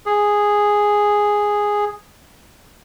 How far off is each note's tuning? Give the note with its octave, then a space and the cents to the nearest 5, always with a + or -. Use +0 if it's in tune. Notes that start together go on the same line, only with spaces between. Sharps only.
G#4 -5